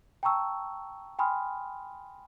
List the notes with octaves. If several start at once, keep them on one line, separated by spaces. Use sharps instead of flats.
G5 A5 A#5 C#6 E6
G5 G#5 B5 C6 D#6 F6